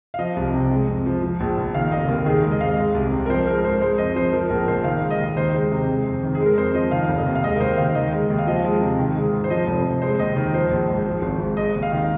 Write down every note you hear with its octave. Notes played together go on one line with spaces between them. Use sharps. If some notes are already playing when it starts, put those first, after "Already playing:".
F5
F3 D#5
C2
C3
G#3
F2
F3
F3
A#1
A#2
D#3 F5
F1 D#5
D#2 A#4
D#3 G#4
G#3
D#5
G#2 F5
D#5
G#3
C2
C3
A#4
F3 C5
G#3 A#4
A#4
G#2 C5
G#3 C5
F2 D#5
F3 C5
F3 A#4
A#1 A#4
A#2 C5
D#3 F5
G#3
D#5
D#2
D#3 C5
G#3
C3
G#3
F2
D#3
G#4
G#3
A#4
F2 C5
F3 D#5
D#3 F5
F1
D#5
D#2
F5
G#3 D#5
A#4
D#2 C5
D#3 F5
D#3 D#5
G#3 D#5
D#2
F5
F3 D#5
F5
G#3
C3
D#3
G#3
G#2
C5
F3 D#5
F1
F2
G#3 C5
D#2 D#5
D#3
F3 C5
A#1
G#2
F3
G#1
G#2
G#3 D#5
D#2
F5
D#3